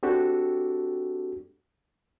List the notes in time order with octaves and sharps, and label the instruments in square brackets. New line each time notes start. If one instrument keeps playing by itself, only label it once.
[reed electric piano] C4 D4 F#4 G4 A4